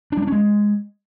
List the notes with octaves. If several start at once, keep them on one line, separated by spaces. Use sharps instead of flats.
D4
G3
D4
C#4
G#3